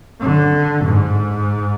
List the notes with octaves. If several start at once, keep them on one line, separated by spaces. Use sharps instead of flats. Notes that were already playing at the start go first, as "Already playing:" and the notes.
D3
G#2